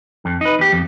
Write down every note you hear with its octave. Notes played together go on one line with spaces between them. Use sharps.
F2
D#4 B4
E2 G4
F2